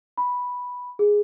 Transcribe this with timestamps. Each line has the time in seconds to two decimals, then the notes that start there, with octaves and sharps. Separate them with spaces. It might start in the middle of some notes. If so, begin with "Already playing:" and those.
0.18 B5
0.99 G#4